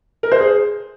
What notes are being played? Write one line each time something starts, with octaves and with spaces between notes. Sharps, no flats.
A#4
C5
G#4